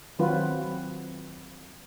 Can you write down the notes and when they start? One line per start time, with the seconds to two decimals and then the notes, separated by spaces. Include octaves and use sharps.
0.19 D#3 F#3 C4 F4 F#4 B4